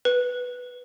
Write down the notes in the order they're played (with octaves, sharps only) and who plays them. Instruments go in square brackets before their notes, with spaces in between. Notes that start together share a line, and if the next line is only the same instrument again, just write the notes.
[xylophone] B4